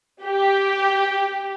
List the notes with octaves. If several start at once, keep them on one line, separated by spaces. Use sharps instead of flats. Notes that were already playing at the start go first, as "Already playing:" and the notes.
G4